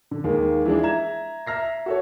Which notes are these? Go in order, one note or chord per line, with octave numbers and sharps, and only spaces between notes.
D3
D#2 D#3 G#3 A#3
E3 F3 G#3 D4
E5 A#5 G#6 E7
E5 A#5 F6 A#6 C7
F#4 A4 C#5